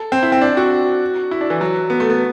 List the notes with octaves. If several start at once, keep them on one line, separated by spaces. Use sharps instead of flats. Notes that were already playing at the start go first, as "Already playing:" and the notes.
Already playing: A4
C4
E4
C4
D4
F#4
E4
D4
E3
F#3
B3
A3
B3